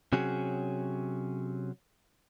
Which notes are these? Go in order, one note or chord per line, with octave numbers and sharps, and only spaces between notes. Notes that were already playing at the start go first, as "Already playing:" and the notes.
C3 F#3 C#4 F#4 G#4